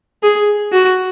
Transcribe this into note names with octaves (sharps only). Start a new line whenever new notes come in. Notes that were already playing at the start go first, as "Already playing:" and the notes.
G#4
F#4